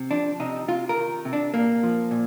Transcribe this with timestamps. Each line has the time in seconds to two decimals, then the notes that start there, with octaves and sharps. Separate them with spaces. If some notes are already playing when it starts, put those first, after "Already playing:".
Already playing: C3
0.11 F3 D4
0.40 C3 D#4
0.68 C3 F4
0.89 A#4
0.97 D#3
1.25 C3
1.33 D4
1.54 A#2 A#3
1.83 F3
2.11 A#2